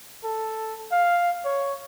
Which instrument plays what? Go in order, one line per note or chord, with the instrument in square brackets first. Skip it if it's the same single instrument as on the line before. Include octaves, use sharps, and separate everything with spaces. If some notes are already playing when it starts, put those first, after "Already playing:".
[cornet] A4
F5
C#5